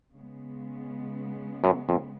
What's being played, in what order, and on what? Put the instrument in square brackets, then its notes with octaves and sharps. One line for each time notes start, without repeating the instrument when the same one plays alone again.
[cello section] C#3 G#3 B3
[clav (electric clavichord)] F#2
F2